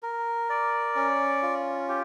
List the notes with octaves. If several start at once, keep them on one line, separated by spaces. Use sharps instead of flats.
A#4
D5
C#4
F4
G4